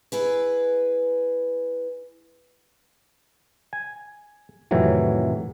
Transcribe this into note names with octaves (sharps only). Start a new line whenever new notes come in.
E4 G#4 B4
G#5
F2 A2 C3 D#3 E3 F#3